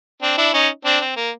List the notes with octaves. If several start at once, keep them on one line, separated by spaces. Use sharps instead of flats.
C4 D4
D4 E4
C#4 D#4
C4 D4
C4
A#3